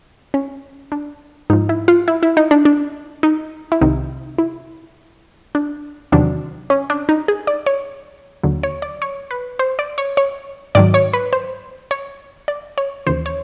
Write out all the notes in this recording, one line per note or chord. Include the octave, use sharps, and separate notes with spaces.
C#4
D4
G#2 F3 D#4
E4
F4
E4
E4
D#4
D4
D4
D#4
E4
C2 C3 D#3 D#4
E4
D4
E2 C3 D#3 F#3 D4
C#4
D4
D#4
G#4
D5
C#5
D#2 D3 F#3
C#5
D5
C#5
B4
C5
D5
C#5
C#5
G#2 D#3 F#3 D5
C#5
B4
C5
C#5
D5
C#5
D#2 C#3 E3 C5
C#5